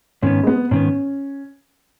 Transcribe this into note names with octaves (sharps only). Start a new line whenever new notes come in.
G#2 D#3 B3 C#4
G#3
B3
G#2 D#3 B3 C#4